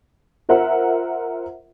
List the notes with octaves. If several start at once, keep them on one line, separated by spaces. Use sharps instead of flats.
F4 A#4 C5 E5 F#5